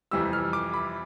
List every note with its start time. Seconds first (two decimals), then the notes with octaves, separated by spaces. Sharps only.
0.11 F2 C3 E3 G3 E6
0.33 F6
0.53 D6
0.74 B5